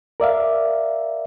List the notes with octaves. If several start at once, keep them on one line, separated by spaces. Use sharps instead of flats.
A#4 D5 E5 F5